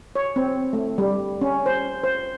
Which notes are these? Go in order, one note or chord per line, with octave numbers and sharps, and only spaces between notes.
C#5
C4
A3
G3
C#4
C5
C5